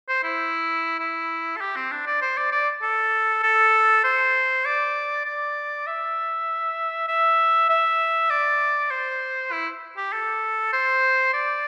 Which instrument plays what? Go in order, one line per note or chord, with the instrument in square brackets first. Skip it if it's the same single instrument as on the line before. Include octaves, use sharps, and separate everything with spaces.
[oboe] C5
E4
E4
A4
G4
C4
D4
D5
C5
D5
D5
A4
A4
C5
D5
D5
E5
E5
E5
D5
C5
E4
G4
A4
C5
D5